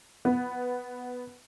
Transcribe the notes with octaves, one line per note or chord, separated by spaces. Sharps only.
B3